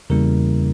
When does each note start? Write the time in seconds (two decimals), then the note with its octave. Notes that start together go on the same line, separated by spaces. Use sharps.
0.10 E2 C#3 G3 A#3 E4 A#4